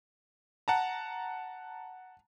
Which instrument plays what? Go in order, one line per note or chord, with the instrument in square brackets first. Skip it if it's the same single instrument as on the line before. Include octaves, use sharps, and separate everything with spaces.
[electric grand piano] F#5 A5 A#5